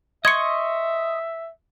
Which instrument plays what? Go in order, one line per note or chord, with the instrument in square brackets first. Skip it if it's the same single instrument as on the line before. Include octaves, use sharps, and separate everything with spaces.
[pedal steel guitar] D#5 C6 C#6 [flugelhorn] E5 [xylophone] G#6 C#7